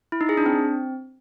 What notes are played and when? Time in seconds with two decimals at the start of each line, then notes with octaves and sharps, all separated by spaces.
0.12 E4
0.21 D#4
0.29 G#4
0.37 D4
0.46 C4